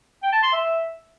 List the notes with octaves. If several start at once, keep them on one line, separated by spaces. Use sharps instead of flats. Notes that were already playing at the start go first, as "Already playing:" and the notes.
G5
A5
C6
E5